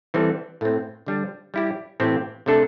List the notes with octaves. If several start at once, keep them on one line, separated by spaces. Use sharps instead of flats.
E3 G3 C4 A4
A2 A3 C4
D3 G3 D4
G3 E4 G4
A2 E3 C4 G4
C3 A3 D4 A4